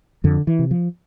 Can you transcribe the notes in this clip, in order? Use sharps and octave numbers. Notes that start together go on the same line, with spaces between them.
F2 D3
E3
C3
F3